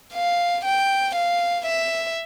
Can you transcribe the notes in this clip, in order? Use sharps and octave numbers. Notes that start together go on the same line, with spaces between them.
F5
G5
F5
E5